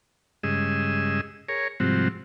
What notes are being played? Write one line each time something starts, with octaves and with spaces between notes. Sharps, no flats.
G2 C#3 G#3 G#4 D#5 E6
G#4 A#4 C#5
G#2 C3 F3 G3 C4 F#4